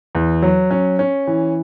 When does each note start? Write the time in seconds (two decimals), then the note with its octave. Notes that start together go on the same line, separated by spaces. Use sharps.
0.15 E2
0.42 F#3
0.71 C#4
0.99 C#4
1.27 E3